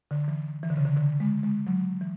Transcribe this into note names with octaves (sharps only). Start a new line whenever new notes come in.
D3
E3
E3
D3
C#3
D3
D3
G#3
G#3
F#3
E3